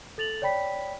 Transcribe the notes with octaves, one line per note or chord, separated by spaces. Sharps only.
A4 A6 F7 F#7
C#5 D5 G5 B5 B6